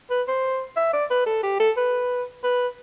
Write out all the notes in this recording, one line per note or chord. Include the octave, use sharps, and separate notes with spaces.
B4
C5
E5
D5
B4
A4
G4
A4
B4
B4